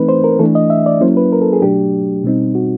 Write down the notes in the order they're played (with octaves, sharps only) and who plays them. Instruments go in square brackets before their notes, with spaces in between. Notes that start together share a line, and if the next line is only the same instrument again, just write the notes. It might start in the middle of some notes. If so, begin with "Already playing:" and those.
Already playing: [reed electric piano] E3 A3 C4 D#4 B4
C5
A#4
E3 A3 D4 A4
D#5
E5
D5
F#3 A#3 C#4 E4 C5
B4
A#4
A4
G#4
B2 F#3 A3 D4 G4
B2 G3 C4 D#4
F#4